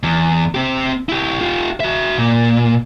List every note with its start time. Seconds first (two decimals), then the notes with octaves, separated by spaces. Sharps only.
0.03 E2
0.55 C4 G4
1.09 E4 G4
1.41 F4 G4
1.80 F#4 E5
2.18 A#2